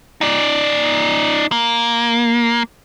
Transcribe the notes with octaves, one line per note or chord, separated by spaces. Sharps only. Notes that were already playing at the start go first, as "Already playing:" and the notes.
D#4 D5
A#3